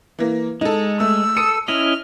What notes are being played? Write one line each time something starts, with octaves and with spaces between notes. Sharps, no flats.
E3 A#3
G#3 D#4 A4
A3 E6
A4 D#6 C#7 D#7
C#4 E4 D#5 F6 F#7